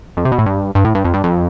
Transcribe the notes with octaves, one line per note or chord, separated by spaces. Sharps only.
F2
C3
B2
A2
G2
G2
A2
G2
F2
G2
F2